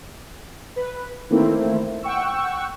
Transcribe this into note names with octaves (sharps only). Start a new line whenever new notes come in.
B4
D#3 E3 A3 A#3 C4 E4
F#5 G5 C#6 E6